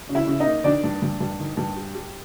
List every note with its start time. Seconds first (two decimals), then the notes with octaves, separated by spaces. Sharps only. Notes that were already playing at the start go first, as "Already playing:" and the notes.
0.09 C#3
0.15 E4 E5
0.27 C#3
0.40 D#4 D#5
0.46 A#3
0.64 D#3 D4 D5
0.84 G2
1.02 G2
1.20 G2
1.40 D#3
1.57 G2
1.76 G3
1.95 G3